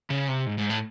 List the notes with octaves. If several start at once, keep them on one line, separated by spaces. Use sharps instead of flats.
C#3
C3
G#2
G#2
A2